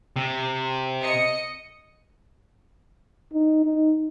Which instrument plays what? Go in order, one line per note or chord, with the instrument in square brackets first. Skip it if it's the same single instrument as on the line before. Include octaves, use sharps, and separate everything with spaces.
[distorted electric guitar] C3
[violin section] D#5 C#7
[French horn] D#4
D#4